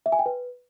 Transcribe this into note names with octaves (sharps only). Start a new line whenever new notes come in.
E5
G#5
G5
B4